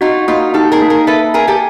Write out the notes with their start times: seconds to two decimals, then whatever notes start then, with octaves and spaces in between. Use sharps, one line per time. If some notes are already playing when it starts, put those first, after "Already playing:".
0.01 D#4 F4 F#4
0.28 A#3 D#4 F4
0.54 D#4 G4 A4
0.72 G#4 A#4
0.82 A#3
0.90 G#4 A#4
1.07 A4 B4 E5
1.34 G#4 A#4 G#5
1.47 G4 A4